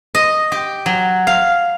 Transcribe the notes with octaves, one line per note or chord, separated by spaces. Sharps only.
D#5
G4
F#3
F5